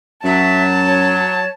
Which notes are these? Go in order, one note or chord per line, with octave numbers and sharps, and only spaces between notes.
F#2 F#3 E5 A5
C#5